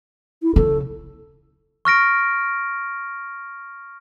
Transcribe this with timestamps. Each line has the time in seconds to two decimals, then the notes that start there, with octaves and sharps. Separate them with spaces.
0.43 E4
0.56 C#3 A4
1.85 C#6 F6 A#6 D7